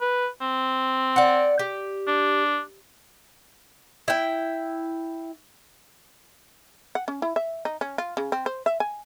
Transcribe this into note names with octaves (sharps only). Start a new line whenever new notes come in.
B4
C4
D5 F#5
G4
D4
E4 G5
F#5
C#4
E4
E5
D#4
C#4
F4
C#3
C4
C5
E5
G#5